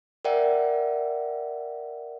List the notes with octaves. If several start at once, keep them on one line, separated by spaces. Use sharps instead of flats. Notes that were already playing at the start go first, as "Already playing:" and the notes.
A#4 D5 E5 F#5 G5